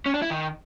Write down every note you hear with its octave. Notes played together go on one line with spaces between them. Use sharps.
C#4
D4
E4
D#3